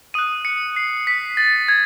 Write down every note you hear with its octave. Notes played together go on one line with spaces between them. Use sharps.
D#6 F#6 D#7
C#7
C7
B6
A6
G#6